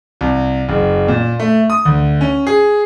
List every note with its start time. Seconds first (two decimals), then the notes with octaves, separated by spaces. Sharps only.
0.21 C2
0.69 F#1
1.08 A#2
1.40 A3
1.70 D#6
1.85 D2
2.21 C#4
2.47 G#4